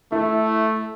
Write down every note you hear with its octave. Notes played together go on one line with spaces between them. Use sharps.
A3 E4